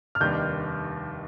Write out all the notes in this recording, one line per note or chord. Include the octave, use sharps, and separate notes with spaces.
F6
F1 D#2 D#3 G3 D4 G6